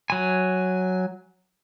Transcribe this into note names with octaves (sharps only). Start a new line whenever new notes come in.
F#3 G#5